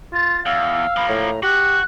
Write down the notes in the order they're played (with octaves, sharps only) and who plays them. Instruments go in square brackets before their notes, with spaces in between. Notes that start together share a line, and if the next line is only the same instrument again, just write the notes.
[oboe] F4 [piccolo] A6
[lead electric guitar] E2 [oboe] F5 [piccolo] E6
[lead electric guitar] F3 A#3 [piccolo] B5
[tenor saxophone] A2 [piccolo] A#5
[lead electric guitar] F#4 [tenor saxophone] G4 [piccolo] F#6